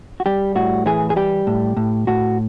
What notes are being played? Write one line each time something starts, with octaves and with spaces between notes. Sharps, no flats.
F#4
G3 G4
A2 F#4
E3 G#4
G#4
G3 G4
A2
A2
A2 F#4